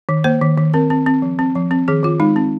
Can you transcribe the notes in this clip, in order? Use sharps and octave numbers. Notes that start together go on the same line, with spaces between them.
D#3
A#3 C5
D#3
D#3
C4 A#4
C4
C4
F3
C4
F3
C4
D#3 G#4
D#3 F4
G#3 D#4
C4